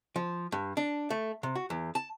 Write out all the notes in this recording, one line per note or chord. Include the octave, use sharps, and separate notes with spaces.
F3
G2
D4
A3
C3
F#4
E2
A5